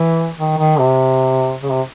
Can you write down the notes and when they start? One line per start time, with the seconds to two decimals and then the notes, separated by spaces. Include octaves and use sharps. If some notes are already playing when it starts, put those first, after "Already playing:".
Already playing: E3
0.38 D#3
0.58 D#3
0.79 C3
1.62 C#3
1.72 C3